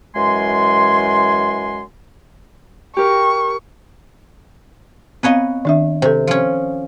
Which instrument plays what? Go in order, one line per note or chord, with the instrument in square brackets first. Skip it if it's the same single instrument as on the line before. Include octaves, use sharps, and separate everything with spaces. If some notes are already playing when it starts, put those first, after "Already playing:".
[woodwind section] F#2 E3 G#3 G#5 C6
[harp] G4 A#4 [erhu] C#6
[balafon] B3 C4 F5 [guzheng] B4 C#5 D#5
[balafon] D#3 D4 E5
[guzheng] C3 [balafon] A4 C5
[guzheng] F3 C#4